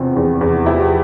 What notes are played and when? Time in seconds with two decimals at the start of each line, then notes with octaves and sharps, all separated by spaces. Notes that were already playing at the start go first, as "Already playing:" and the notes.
Already playing: E2 C3 F3 C4
0.16 E2
0.41 E2
0.66 F3 E4 G4